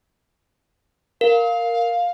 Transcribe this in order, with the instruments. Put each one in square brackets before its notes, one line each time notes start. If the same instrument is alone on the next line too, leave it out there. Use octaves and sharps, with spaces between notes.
[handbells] A#4 [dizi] F5